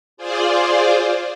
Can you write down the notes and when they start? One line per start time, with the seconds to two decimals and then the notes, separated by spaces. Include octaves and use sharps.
0.17 F4 G#4 C5 D5